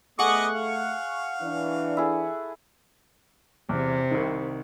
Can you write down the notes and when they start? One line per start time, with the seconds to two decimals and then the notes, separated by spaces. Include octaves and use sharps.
0.19 A3 B3 G#4 D#5 F#5 C#6 D6
0.54 F5
1.41 E3 D4
1.97 E4 G#4 A4
3.69 E2 C3
4.11 C2 D#3